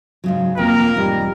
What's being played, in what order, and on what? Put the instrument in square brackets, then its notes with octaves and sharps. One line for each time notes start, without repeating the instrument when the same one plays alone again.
[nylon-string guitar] G#2 C#3 F#3
[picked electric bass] E1 F2 [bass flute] A#3 [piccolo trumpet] A#4 [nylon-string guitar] G5
[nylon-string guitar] G#2 D#4 [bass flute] G3